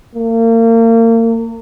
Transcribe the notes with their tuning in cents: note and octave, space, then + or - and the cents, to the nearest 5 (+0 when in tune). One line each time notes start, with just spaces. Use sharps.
A#3 -35